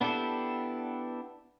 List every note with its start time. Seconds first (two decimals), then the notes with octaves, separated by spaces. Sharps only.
0.01 B3 D4 E4 G4 A4